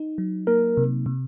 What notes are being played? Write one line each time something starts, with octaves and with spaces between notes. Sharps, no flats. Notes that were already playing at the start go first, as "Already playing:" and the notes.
Already playing: D#4
F#3
A#3 A#4
C3
C3